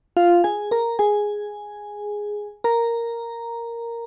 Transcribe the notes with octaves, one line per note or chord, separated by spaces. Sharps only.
F4 F5
G#4 G#5
A#4 A#5
G#4 G#5
A#4 A#5